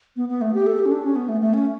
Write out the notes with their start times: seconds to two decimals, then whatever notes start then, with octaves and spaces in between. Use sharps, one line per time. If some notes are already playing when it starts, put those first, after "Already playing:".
0.16 B3
0.29 B3
0.41 A3
0.54 G4
0.67 A4
0.79 G4
0.86 C#4
0.92 D4
1.04 C#4
1.16 B3
1.29 A3
1.41 A3
1.54 C#4